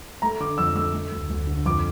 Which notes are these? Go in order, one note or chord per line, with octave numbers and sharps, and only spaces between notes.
A3 A#5
D3 D6
F2 E6
A3 E6
A3
D2
D2
D3
F2 D6